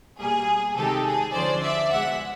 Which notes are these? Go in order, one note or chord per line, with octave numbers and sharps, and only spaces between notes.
B2 G3 A#3 G#4
C3 D#3 G#3 C4 D#4 G4 A4
G#4
D2 D3 F3 G#3 C#4 C5 D5
D5 E5
C2 B2 G#3 E5 F#5